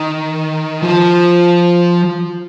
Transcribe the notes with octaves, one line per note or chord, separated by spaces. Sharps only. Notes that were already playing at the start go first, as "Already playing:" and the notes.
Already playing: D#3
F3